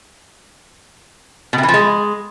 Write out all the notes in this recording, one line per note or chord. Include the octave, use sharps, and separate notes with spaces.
B2
C3
E3
F3
G#3